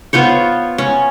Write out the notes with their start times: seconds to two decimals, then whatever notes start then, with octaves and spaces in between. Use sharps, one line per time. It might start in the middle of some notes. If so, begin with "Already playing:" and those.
0.13 B3 F4 C5 C#5
0.78 C#4